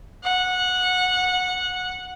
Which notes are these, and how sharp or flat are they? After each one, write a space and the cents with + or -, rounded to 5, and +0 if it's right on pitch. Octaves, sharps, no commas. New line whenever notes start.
F#5 -15